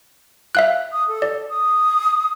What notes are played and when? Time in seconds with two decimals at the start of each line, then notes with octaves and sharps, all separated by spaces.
0.55 E5 F5 F#6
0.92 D#6
1.08 A4
1.22 D5
1.49 D#6